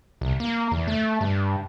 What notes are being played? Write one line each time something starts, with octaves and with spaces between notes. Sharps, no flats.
C2
A#3
E2
A3
G2